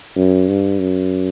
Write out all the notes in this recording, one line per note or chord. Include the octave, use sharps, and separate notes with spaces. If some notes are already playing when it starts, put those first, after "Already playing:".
F#2
G2
F#2